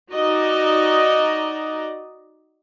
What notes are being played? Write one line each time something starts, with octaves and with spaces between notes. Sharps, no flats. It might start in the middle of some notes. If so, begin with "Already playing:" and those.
D#4 F#4 D5 D#5 A#5